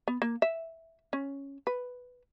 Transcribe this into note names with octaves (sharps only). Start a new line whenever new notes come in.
B3
A#3
E5
C#4
B4